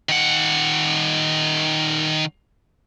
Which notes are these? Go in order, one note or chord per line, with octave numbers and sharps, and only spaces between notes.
D#3 F#5